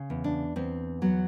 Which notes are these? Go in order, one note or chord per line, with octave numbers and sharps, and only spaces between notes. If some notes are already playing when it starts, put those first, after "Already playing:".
Already playing: C#3
E2
D4
E2 C4
F#3 B3